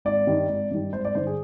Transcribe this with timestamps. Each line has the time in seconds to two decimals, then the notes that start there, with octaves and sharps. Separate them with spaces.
0.05 G#1 D5
0.27 G2 D#3 G3
0.49 G#1
0.71 G2 D#3 G3
0.92 G#1 C5
1.05 D5
1.15 G2 D3 C5
1.27 G#4